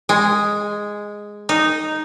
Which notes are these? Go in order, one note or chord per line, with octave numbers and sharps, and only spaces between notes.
G#3
D#4